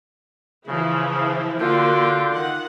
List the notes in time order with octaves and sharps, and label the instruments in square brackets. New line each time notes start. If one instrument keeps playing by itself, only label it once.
[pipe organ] C#3 [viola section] E3 F3 E4
[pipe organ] D3 G5 [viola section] A#3 F#4 [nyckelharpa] F4
[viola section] D#3 F#5